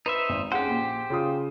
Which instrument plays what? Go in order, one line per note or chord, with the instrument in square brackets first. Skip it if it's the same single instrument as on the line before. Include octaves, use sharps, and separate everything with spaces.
[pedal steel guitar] D#4 C5 E5 [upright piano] B4
[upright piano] G#1
[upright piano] C#4 G#4 F#5 [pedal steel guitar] G4 C5
[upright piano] A#1 A#2
C#3 F4 D#6